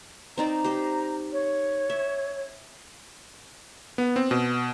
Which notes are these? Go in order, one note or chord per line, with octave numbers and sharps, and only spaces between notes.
C4 D#4 D5 A#5
G4 C5
C#5
E5
B3
C4
B2